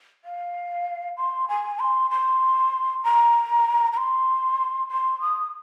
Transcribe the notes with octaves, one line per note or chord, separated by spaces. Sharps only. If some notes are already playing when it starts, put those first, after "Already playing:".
F5
C6
G#5
C6
C6
A#5
A#5
C6
C6
D#6